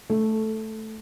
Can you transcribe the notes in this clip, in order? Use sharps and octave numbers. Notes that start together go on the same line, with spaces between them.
A3